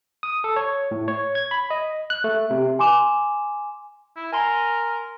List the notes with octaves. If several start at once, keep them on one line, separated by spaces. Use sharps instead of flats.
D#6
A4
C#5
A2
C#5
G#6
B5
D#5
F#6
A3
C3
G#5 C6 D6 E7
E4
A#4 G#5 A#5 C6